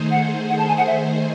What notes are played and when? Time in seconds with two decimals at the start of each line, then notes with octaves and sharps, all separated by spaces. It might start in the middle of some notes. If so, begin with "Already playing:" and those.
Already playing: D#3 A3 D#4 G#4 C5
0.11 F#5
0.49 F#5
0.58 A5
0.68 G#5
0.77 F#5
0.87 E5